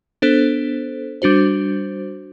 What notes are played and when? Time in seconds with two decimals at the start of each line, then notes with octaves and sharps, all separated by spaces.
0.22 B3 D4 A4 C5
1.22 G3 D4 F#4 C5